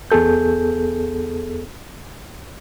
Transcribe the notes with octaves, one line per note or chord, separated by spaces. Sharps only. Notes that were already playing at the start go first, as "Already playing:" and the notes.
E2 B3 G#4 A4 G6